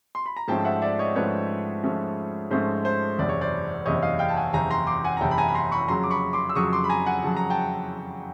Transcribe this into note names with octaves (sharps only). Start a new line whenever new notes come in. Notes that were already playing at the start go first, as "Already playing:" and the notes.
C6
B5
A#5
G#2 F3 A3 C#4 G5 A5
E5 F#5
D5 E5
C#5 D#5
G#2 F3 A3 C#4 B4 C#5
G#2 F3 A3 C#4
G#2 F3 A3 C#4 C5
C5
F#1 E2 C3 D5
C#5
C5 D5
F#1 E2 C3 C#5 D#5
D#5 F5
F5 G5
A5
F#5 G#5
F#1 E2 C3 G#5 A#5
A#5 C6
C6 D6
F#5 G#5
A#5
F#1 E2 C3 G5 A5
B5
G#5 A#5
B5
A#5 C6
B5 C#6
F2 C#3 F#3 A#5 C6
D6
B5 C#6
C6 D6
E6
F2 C#3 F#3 C#6 D#6
C6 D6
B5
G#5 A#5
F#5 G#5
F2 C#3 F#3 A5
A#5
G5 A5